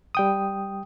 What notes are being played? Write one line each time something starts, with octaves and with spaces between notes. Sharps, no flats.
G3 G5 D#6